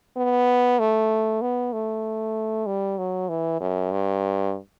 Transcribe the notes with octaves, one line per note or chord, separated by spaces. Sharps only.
B3
A3
B3
A3
G3
F#3
E3
F#2
G2